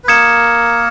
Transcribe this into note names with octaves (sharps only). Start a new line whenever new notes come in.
B4
A#3 A#4 D#6 G#6 C#7 E7